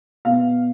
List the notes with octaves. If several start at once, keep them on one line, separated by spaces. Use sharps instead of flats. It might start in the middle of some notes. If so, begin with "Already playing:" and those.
B2 F5